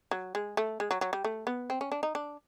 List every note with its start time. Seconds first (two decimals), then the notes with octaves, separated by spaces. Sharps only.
0.11 F#3
0.35 G#3
0.57 A3
0.80 G#3
0.91 F#3
1.01 F#3
1.13 G3
1.25 A3
1.47 B3
1.70 C4
1.81 C#4
1.92 D4
2.03 D#4
2.15 D4